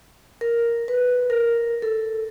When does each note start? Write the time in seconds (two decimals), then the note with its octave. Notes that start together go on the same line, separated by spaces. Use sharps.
0.41 A#4
0.88 B4
1.30 A#4
1.82 A4